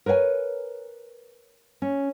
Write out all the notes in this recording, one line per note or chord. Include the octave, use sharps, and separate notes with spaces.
A#4 B4 C#5 F5 G#5
C#4